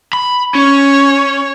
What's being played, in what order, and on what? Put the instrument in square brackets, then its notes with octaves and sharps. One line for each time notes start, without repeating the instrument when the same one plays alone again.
[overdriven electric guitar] B5
[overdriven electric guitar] C#4 [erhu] C#5